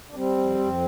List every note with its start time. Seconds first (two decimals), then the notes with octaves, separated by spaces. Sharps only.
0.10 D4
0.15 G3 C4
0.37 F2
0.58 F2